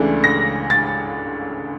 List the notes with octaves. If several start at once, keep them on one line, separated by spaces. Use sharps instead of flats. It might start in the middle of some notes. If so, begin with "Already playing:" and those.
Already playing: C#2 C#3 E3 A3 D4
A#6
A6